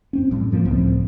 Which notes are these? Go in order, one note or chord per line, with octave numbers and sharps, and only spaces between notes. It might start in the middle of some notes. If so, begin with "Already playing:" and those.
F#2 C4 C#4
A1 A2 G3
F#2 F3 A3 A#3
C#2 A2 F3 C4